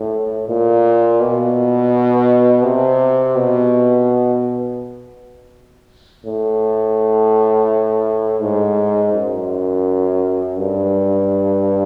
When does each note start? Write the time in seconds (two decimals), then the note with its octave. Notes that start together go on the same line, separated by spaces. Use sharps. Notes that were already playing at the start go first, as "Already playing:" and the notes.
Already playing: A2
0.48 A#2
1.20 B2
2.64 C3
3.37 B2
6.25 A2
8.41 G#2
9.13 F#2
10.58 G2